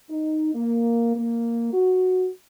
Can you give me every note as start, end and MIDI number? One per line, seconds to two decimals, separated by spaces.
0.10 0.52 63
0.54 1.12 58
1.16 1.73 58
1.73 2.28 66